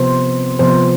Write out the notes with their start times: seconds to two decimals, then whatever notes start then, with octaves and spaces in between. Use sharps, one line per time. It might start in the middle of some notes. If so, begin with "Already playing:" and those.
Already playing: C3 F3 B3 C5
0.59 C3 F3 B3 C5